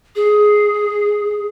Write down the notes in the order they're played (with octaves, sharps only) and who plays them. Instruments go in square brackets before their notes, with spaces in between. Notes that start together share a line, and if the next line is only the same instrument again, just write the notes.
[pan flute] G#4